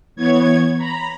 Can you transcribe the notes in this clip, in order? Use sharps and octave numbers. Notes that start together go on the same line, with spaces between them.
E3 B3 C#5 G#6
A#5 B5